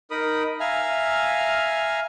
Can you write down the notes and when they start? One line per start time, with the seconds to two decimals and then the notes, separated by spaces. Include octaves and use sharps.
0.11 D#4 A#4 B5 D#6
0.60 E5 F5 G#5 A#5 F6